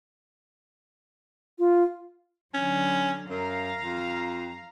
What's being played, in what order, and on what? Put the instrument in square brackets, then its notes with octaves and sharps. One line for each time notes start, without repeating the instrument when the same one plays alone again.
[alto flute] F4
[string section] D3 F#3 [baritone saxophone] C#4
[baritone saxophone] F#2 [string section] F5 A#5
[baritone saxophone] F2